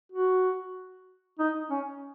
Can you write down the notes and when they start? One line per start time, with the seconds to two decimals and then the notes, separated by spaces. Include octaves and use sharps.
0.12 F#4
1.39 D#4
1.70 C#4